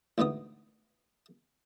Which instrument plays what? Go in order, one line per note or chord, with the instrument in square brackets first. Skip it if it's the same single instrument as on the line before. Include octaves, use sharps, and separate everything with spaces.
[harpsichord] A1 D2 G#2 B3 D#6